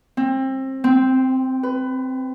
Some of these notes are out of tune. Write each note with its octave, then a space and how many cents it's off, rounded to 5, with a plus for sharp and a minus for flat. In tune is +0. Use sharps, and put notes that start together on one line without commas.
C4 +25
C4 -5
B4 +25